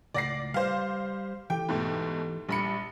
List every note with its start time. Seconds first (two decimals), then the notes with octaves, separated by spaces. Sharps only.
0.14 C#2 A2 D5 F#5 A#6 C7
0.54 G3 C5 F5
1.50 E3 G4 A4 G5
1.69 G#2 B2 A3
2.49 A#1 G3 B5 C#7